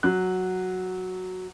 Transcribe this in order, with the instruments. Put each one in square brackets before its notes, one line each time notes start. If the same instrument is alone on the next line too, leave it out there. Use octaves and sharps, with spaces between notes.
[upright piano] F#3 F#6